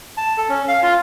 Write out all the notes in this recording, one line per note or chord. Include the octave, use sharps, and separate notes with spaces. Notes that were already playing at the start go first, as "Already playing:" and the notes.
A5
A4
C#4
F5
F4